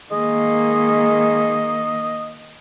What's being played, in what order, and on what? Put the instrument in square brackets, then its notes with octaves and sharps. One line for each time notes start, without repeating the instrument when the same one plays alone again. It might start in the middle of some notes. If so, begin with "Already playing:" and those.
[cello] D#3 A#3 [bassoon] G#3 [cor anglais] D#5